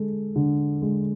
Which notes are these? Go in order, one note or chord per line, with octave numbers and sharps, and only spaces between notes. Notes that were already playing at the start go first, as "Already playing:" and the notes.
Already playing: D3 G#3 A4
D3
G#3